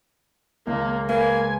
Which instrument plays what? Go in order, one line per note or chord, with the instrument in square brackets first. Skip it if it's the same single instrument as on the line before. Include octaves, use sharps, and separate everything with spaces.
[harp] C#2 [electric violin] A#3
[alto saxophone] A#3 [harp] B4 [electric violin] G#5